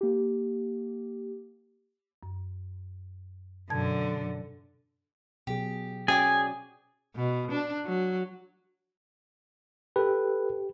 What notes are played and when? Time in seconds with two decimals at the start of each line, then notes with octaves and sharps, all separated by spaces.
0.01 A#3 G4
2.23 F#2
3.70 F#2 B2 D3 A5 G#6
5.47 B2 F#3 G4 G#4
6.08 C#4 F#4 G#4 C5 D5 G5 G#5 D6
7.16 B2
7.52 D4
7.85 F#3
9.96 G4 A4 B4